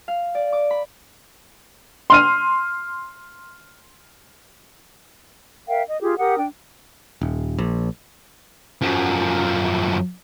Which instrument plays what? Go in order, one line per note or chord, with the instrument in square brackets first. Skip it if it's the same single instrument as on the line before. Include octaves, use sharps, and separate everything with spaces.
[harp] F5
D5
D6
B5
[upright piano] C6 F6 D#7
[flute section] A#4 E5 F5 G5
D#5
F4 G4 G#4
G4 A#4 F#5 D#6
D4 G5
[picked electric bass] D#1
A#1
[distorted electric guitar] F#2 F3